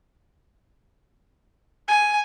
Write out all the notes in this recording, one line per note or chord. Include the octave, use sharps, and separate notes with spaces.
G#5